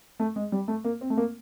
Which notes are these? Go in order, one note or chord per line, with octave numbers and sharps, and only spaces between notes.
A3
G#3
G3
A3
A#3
C4
A3
A#3